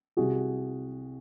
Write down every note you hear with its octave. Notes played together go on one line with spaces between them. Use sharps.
C2 F#4 G#4